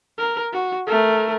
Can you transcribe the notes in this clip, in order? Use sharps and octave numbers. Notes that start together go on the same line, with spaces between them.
A#4
F#4
A3 A#4